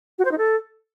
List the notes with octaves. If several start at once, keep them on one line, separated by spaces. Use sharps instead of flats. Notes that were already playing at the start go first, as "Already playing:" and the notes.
F#4
C5
D#4
A4